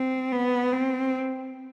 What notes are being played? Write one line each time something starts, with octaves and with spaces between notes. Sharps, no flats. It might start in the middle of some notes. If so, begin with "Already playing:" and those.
Already playing: C4
B3
C4